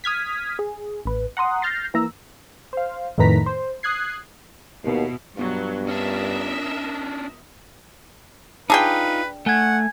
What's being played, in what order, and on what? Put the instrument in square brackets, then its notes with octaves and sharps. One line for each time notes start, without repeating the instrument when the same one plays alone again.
[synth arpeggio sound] D#6 F6 G#6 B6
G#4
A1 B4
F#5 A#5 C6 D#6
F6 G6 A6 A#6 C7
E3 A#3 A#5 E6
[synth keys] C5 F5
F2 A2 D#3 B4 A#5 B6
C5
D#6 F#6 G#6 C7
[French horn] D#2 [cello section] B2 E4
[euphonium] G2 [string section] B2 F#3 [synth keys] B3 F4
[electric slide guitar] C#4 D4 [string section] A#4 D#5 E5
[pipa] D4 G#4 G5 [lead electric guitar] D#4 F4 [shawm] B4
[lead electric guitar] A3 [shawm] F#5 [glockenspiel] G#5 G#6